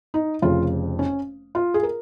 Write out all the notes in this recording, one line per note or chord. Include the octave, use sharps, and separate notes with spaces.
D#4
F1 F2 C#3 F4
C#4
F4
G#4
A#4